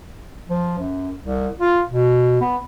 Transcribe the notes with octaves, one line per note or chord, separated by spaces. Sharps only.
F3
F#2
C2
F4
B2
B3